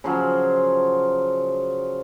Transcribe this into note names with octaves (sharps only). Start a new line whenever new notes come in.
C#3 F3 F#3